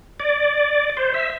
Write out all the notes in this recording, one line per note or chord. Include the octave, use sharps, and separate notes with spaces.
D5
C5
E5